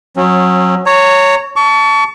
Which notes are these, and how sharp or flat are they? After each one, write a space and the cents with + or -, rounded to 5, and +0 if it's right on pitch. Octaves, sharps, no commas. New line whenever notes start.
F#3 -20 C#4 -35
C#5 +0 A#5 -30
A5 +0 C#6 +35